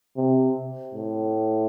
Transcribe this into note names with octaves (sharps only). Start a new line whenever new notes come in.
C3
A2